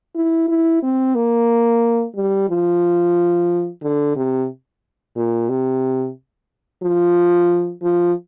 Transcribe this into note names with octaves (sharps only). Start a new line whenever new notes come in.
E4
E4
C4
A#3
G3
F3
D3
C3
A#2
C3
F3
F3